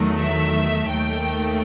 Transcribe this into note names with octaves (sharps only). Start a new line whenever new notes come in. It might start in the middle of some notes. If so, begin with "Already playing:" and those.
Already playing: E2 D#3 F#3 A3
E5
D#2 D#3 A3 G5